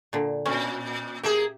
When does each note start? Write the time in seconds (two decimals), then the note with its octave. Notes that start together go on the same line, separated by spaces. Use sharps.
0.13 A#2 D3
0.46 A#2 C#4
1.23 A#3 G4 G#4 E5